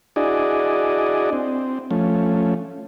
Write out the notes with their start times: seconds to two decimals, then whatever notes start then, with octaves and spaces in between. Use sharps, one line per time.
0.16 D4 E4 F#4 G#4 D5 D#5
1.33 C4
1.91 F3 A3 C#4